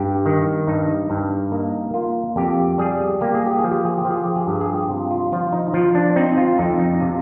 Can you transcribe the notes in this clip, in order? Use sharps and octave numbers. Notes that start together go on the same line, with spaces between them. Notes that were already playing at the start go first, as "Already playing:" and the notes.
Already playing: G2 G4
D#3
G2 D#4
G2
A#3 D#4
A#3 F4
F2 G4
G3 G#4
A#3 G4
G#4
G4
G#4
F3
G4
G#4
G4
F3
G#4
G4
G#4
G2 G4
G#4
G4
C3 F4
F4
F3 F4
D#4
F3 F4
D4
C4 D#4
F4
F2 D#4
D#4
C3 F4